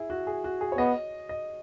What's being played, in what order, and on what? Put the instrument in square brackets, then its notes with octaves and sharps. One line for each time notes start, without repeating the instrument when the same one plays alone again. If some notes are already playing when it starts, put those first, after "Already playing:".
Already playing: [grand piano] E4 G#4
F#4
G#4
F#4
G#4
C#5
[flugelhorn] B3 [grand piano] D#5
[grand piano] D#5